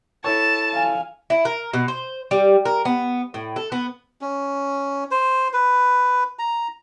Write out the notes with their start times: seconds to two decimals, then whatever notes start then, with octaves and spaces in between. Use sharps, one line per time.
0.24 E4 A4 C#5 A5
0.73 F5 G#5
1.30 E4
1.45 A#4
1.73 B2
1.88 C5
2.31 G3
2.65 A#4
2.85 B3
3.34 A2
3.56 A4
3.72 B3
4.21 C#4
5.11 C5
5.53 B4
6.39 A#5